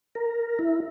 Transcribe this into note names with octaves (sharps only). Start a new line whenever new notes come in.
A#4
E4